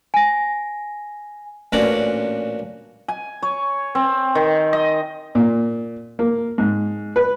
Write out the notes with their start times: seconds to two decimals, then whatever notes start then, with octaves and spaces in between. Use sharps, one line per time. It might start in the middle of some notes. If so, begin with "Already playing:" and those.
0.14 G#5 A#6
1.72 A1 A#2 C#4 D4 F#4 D5
3.08 G#5
3.43 C#5
3.95 C4
4.35 D#3
4.73 D#5
5.35 A#2
6.19 A#3
6.58 G#2
7.16 B4